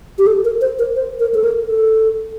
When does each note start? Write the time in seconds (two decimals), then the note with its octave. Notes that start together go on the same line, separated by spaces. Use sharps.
0.18 G4
0.27 A4
0.44 A#4
0.61 C5
0.79 A#4
0.96 C5
1.20 A#4
1.34 A4
1.44 A#4
1.67 A4